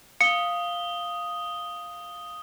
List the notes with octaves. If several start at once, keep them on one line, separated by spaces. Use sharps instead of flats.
F5 D#6 C#7 G7